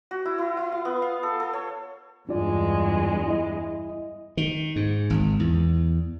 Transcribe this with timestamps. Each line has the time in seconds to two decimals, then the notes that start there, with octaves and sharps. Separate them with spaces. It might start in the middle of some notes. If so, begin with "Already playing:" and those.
0.11 F#4
0.25 E4
0.38 E4
0.57 E4
0.72 F5
0.85 B3
1.02 F5
1.23 A4
1.40 A4
1.53 C#5
2.29 E2 G2 G#3 D4 F4 D5
3.27 E4 D#5
4.37 D#3
4.76 G#2
5.10 G#1
5.40 E2